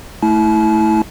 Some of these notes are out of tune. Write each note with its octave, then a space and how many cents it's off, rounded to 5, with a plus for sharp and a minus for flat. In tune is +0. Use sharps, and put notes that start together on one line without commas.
A3 +0 E4 -20 A5 -40